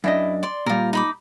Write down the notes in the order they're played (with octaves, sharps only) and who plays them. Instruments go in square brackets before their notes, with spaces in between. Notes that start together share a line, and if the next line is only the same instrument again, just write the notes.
[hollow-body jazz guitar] F#2 D4 D#5 [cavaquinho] E4
[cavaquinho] D5 C6
[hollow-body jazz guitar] A#2 G3 [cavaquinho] F4 A#4
[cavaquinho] D#4 B5 D6